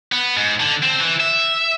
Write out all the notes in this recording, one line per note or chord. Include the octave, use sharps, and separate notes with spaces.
B3
G#2
D3
C4
E3
E5